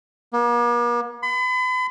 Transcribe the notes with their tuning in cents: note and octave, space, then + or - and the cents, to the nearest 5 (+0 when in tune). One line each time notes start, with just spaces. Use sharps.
A#3 +45
B5 +40